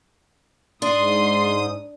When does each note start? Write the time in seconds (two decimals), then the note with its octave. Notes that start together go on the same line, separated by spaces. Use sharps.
0.82 G#2 D4 C6 D#6